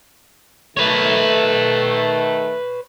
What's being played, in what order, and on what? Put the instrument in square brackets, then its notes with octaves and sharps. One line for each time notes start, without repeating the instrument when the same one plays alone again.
[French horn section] D#3 A3 [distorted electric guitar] B4 C#5